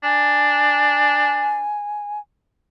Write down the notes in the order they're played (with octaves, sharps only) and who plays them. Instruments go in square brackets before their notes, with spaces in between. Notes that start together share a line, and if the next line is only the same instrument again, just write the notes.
[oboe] D4 [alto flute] G#5